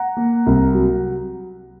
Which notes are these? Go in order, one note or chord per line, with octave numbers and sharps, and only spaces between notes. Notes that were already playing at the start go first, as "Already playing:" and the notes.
Already playing: F#5 A#5
A#3
C2
F#3